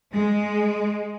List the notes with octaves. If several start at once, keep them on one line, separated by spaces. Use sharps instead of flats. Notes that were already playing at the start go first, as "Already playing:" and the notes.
G#3